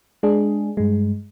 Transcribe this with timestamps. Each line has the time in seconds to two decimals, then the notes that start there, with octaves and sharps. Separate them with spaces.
0.23 G#3 D4 G#4
0.77 G2 G#3